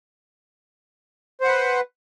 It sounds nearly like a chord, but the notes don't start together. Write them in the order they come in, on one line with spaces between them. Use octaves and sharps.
C5 F#5 B4